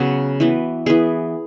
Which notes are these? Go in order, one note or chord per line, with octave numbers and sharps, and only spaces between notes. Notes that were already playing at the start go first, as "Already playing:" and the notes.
Already playing: C#3 F#3 B3 F#4
E3 B3
E3 B3 G#4